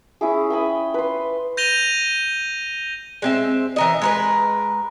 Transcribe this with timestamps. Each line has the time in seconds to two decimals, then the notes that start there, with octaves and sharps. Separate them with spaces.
0.21 C#4 E4 G#4
0.50 G5 G#5 B5 D#6
0.94 B4 C6
1.57 G6 A#6 D#7 F7 G7
3.22 G#3 C4 E5
3.76 E3 A#4 D#5
4.02 G#3 A#4 B4